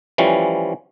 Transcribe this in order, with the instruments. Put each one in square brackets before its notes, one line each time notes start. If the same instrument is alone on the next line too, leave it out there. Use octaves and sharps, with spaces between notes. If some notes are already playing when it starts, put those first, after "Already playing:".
[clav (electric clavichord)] E3 F3 G3 A3 C#4